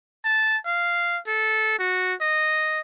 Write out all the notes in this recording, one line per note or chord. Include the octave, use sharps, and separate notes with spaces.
A5
F5
A4
F#4
D#5